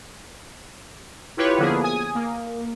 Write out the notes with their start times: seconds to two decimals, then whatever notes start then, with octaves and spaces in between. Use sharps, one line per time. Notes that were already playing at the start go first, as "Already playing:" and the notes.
1.37 E4 F4 G4 B4 C#5
1.58 D3 F3 A#3 B3 E4 G#4
1.84 G#5 D#6
2.15 A#3